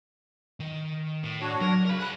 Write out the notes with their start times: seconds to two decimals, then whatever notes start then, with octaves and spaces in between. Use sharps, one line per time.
0.60 D#3
1.23 A2
1.41 D4 F#4 C#5
1.61 F#3 A#4
1.85 C#3 A#4 B5
1.99 G#4 A#4 B5 F#6